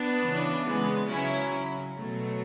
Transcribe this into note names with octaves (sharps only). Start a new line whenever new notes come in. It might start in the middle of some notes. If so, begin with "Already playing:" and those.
Already playing: B3 D4
C#3 E3
G#3 B3
C#3 F#3 C#4 E4
B2 F#3 A3